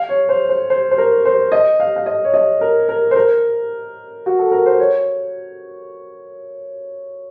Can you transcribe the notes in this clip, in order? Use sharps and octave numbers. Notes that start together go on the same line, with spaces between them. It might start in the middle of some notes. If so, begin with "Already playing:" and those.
Already playing: F5
C#5
C5
C5
C5
C5
A#4
C5
D#5
F5
F5
D#5
C#5
D#5
A#4
A#4
C5
A#4
F#4
A4
A#4
C5
C#5